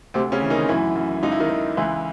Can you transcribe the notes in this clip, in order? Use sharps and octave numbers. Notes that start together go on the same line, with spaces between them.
D2 C3 C4
C#3 C#4
E3
D#3 D#4
F#2 E3 E4
F#2
C#2 D#4
E4
D#3 D#4
D#3
C#2 E3 E4